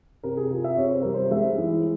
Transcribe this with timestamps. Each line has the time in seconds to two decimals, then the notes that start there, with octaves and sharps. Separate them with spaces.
0.23 C3 A#4
0.37 G#4
0.50 C3 F4
0.64 E5
0.77 C3 C#5
0.90 C5
1.02 G3 A#4
1.14 C5
1.31 G#3 E5
1.58 E3